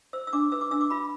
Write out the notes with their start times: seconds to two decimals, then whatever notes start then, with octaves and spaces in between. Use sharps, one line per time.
0.13 C5 E6
0.27 E6
0.33 D4 D6
0.52 B4 E6
0.61 D6
0.71 D4 E6
0.81 D6
0.90 F4 B5